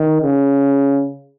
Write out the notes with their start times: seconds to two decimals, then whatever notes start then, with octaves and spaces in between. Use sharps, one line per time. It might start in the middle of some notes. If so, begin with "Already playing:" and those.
Already playing: D#3
0.23 C#3